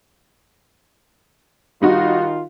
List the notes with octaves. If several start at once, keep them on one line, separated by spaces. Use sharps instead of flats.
D#3 G3 D#4 F4 F#4